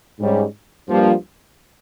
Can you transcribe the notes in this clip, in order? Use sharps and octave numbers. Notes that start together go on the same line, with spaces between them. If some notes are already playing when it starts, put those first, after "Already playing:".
G#2 G3 C#4
G2 F3 A#3